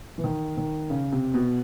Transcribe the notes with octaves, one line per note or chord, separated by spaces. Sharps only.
E3
D#3
D#3
C#3
C3
B2